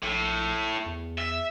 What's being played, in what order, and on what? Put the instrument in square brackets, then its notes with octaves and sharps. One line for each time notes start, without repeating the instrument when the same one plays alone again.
[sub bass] A#1 [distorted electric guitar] A2
[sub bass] E2
[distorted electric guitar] E5